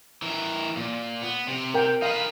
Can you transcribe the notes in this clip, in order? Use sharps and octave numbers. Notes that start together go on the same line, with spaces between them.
E3 A#4
A#2
B3
C3
A#4 G5
D#4 B4 F5